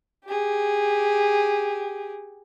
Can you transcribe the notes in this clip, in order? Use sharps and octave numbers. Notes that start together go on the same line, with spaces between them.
G4 G#4